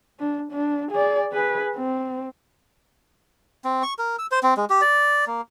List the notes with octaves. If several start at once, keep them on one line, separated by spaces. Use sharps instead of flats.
D4
D4
G#4 D5
G#4 B4
C4
C4
C#6
A#4
E6
C5
C4
G#3
G4
D5
A#3